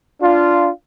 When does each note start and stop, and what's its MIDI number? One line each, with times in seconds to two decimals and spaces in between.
0.21 0.70 62
0.21 0.70 65